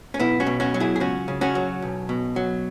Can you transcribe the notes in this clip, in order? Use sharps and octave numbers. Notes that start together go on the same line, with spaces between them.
C#4
B1 B3 E4
C#4 F#4
B2
C#4 F#4
F#3
E4 G#4
G#4
C#2 C#4 F#4
C#3
C#4 F#4
F#3
B1
B2
F#3